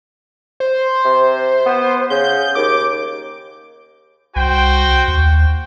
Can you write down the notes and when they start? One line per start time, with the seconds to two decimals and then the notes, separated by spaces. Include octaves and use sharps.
0.60 C5
1.04 C3
1.66 B3
2.10 C#3 G6
2.55 D#2 D6
4.36 C2 F#4 C5 G5
5.08 D#2